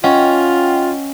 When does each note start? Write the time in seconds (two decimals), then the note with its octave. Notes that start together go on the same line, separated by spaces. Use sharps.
0.04 C#4 F4 D#5 F#5 G5